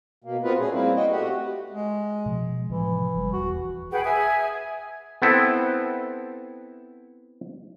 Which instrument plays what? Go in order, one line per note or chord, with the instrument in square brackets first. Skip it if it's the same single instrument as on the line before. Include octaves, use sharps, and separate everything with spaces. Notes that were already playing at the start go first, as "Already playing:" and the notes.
[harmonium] B2 A#3
B3 C4 F4 A#4 B4
A#2 A3 C#4 G#4
G3 A#3 C4 E4
B3 F#4 D#5 G5
A3 F#4 G4 F#5
[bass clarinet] G#3
[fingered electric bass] B2 F3
[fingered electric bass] A2 C3 F3 [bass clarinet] E3
[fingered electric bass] G1 G3
[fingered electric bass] E1 [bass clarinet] F#4
[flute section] G#4 B4 F#5 G5
E5 G#5 D#6
[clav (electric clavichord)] B3 C4 E4 A4